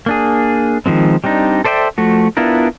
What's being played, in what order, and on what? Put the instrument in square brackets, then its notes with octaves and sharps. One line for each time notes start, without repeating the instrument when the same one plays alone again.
[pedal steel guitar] A#3 D4 G#4
D#3 F3 G#3 C4
G3 C4 D4 D#4
A4 C5 D5 E5 G5
F3 A3 F#4
B3 D4 E4 F4 A#4